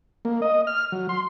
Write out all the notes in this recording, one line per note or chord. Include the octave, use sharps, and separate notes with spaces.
A#3
D#5
F6
F#3
C6